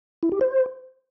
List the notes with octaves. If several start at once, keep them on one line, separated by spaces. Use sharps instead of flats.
E4
G4
C5